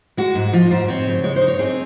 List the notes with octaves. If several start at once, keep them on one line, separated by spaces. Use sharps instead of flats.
G#3 F#4
G#2
F3 F4
G#2 C5
C4 C#5
C#3
G#3 C#5
C5
D#4
C#5
C4 G#4